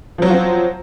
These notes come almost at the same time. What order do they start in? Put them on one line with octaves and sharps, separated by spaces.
F3 F#3 F#4 F4 C4